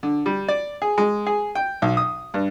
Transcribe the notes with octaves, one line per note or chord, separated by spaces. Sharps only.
D3
G3
D5
G#4
G#3
G#4
G5
B1
D#6
G2